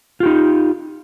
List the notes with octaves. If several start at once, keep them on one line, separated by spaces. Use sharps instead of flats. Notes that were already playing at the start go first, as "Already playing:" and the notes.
D#4 F4 G4